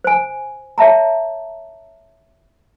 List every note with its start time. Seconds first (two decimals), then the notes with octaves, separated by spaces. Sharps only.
0.04 C5 G#5
0.78 C#5 E5 A5 A#5